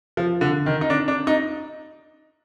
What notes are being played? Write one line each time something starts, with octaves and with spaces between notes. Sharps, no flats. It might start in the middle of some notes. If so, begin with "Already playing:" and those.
F3
D3
D#3
D#4
D4
D4
D#4